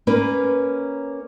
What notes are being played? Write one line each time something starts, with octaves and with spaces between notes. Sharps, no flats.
A#3 C#4 A#4 B4